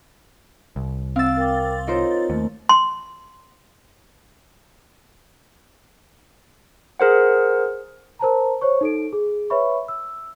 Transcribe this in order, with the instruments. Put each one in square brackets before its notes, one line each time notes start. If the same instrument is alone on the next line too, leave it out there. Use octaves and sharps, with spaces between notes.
[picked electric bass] C2
[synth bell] C4 A6 [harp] F5 E6
[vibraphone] A#4 G5 D6
[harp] D#4 A#4 C5 [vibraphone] F4 C#5
[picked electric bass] D#2 [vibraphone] A3
[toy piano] C6
[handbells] G#4 A#4 C5 F#5
[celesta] A#4 C5 A5 A#5
C5 C#5 C#6
D#4 A4 D7
G#4
B4 C#5 E5 B5 C#6
E6